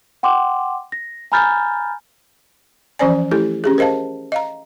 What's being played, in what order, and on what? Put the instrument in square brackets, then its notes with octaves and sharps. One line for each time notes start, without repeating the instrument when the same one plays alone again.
[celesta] F#5 G5 C6 D6
A#6
G#5 A#5 B5 F6 G6 A6
[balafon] E3 F3 C#4 C5 D5 G#5
A3 E4 G4 A4
C#4 G4 G#4
A#4 C5 D#5 F5 A5
D#5 F5 A#5